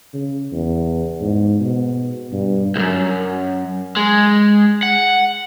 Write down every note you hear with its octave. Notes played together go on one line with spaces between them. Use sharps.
C#3
E2
G#2
B2
G2
C2 F#2
G#3
F#5